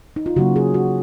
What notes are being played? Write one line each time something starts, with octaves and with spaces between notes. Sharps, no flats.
D#4
F4
C#3 F#3 A#3 F#4
G#4
F#4